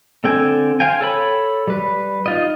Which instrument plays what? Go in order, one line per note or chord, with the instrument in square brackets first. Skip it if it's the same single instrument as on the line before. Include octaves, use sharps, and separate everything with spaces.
[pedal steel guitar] D3 C4 A4 G5 G#5
C5 F5 G5 G#5
A4 C#5 B5
G3 B4
D#4 F4 D#5